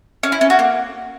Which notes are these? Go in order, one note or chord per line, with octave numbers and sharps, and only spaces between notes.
C#4
E4
C#4
F#4
A#3